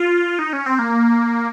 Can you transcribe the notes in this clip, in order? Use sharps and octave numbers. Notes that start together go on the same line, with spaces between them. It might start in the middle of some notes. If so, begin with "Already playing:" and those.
Already playing: F4
D#4
C#4
C4
A#3